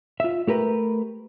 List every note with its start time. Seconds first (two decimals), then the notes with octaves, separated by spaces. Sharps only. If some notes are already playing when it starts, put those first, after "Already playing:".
0.20 F4 E5
0.47 A3 G4 A#4 B4